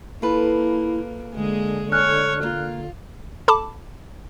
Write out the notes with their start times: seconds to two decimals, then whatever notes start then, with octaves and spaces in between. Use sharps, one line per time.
0.22 A#3 E4 F4 A4 B4
1.35 D3 G#3 A#3 G#4
1.92 A4 C#5 G#5 F6 F#6
2.43 A#3 F4
3.48 A4 A5 B5 D6